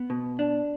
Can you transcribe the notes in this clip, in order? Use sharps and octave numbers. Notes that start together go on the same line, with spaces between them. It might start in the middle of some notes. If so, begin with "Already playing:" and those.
Already playing: B3
B2
D4